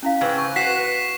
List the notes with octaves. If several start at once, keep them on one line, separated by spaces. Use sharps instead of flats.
C#4 E4 F5
G#2 C#3 C4 B4
C#6
F#4 B6 C7 E7